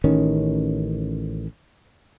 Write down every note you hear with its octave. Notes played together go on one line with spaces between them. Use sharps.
A1 D#3 C#4